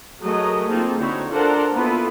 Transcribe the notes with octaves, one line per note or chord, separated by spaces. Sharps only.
F#3 A3 G#4 A#4 D#5
A#3 C4 D#4 F4 G#4 A4
D3 C4 D#4 E4 F#4 C#5
D4 F4 A4 A#4 C5 F#5
A#3 B3 E4 F4 A4 B4